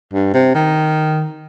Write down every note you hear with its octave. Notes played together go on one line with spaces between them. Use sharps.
G2
C3
D#3